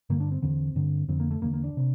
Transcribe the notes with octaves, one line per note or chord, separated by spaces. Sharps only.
G2 D3 A#3
D4
C4
E2 D3 C4
G2 D3
F2 D3 C4
A#3
A3
E2 D3 A#3
A#3
D4
C3